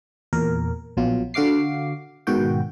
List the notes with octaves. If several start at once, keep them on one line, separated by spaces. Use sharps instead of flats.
E2 A#2 A#4
A#1 B2 F#3 F4
D3 F#4 F5 D6 C7
G#2 B2 D#3 F#4 G5